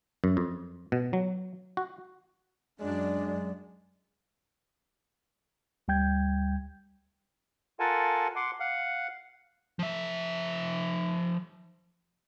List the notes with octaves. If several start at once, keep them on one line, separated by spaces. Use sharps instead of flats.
F#2
F2
B2
F#3
F#4
F#2 F#3 G#3 D4 D5
D2 G3 G5 G6 G#6
F4 A4 A#4 F#5 G#5 A5
F#5 C6 D6
F5 F#5
F3 E5